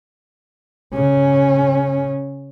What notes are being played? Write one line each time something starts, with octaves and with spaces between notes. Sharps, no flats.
C#3 C#4